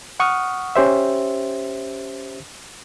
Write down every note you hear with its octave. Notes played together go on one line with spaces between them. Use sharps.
F#5 C#6 D#6 F6
C#4 G4 C5 E5